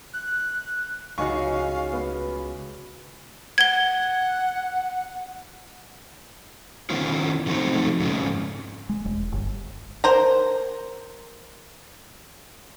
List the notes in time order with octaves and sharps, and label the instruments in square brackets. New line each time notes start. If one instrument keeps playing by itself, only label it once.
[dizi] F#6
[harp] C#2 F#4 [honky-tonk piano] D#4 G#5 C#6 [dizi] F5
[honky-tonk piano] B3
[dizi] F#5 [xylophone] G#6 G7
[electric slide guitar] D#3 B3 C#4 E4 F4
D3 F3 F#3 A3 C4 D#4
F2 G#2 C#3
[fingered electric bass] G#3
E1
G1
[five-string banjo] A#4 C5 A#5